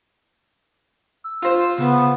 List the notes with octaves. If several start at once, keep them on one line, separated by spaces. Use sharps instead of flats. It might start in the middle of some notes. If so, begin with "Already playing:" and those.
E6
F4 C5
C#3 B3